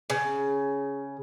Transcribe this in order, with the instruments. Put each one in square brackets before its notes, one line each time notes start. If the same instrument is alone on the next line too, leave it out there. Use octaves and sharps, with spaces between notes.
[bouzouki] C#3